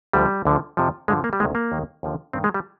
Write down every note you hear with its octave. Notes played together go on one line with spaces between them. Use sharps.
D2 D3 F3 G3
D2 D3 F3
F2 C3 F3
G2 D3 F3 G#3
A#3
G3
D2 C3 D#3 G#3
A#3
D#2 D#3
D#2 D3 F3
G2 D#3 C4
G#3
G3